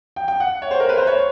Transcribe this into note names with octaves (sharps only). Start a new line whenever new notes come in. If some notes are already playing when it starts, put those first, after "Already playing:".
G5
G5
F#5
C#5
C5
A#4
B4
C5
C#5